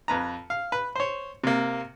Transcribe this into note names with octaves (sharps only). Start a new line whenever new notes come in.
F2 B4 A#5
F5
B4
C5 C#5
C3 A#3